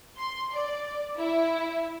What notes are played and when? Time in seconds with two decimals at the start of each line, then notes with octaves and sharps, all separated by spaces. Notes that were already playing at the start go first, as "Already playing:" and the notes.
0.18 C6
0.53 D5
1.18 E4